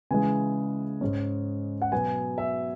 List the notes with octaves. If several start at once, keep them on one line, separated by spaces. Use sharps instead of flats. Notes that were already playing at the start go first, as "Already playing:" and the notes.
C#3 E3 G#3 G#5
G#2 G#3 C#4
F#5
B2 F#3 B3 G#5
E5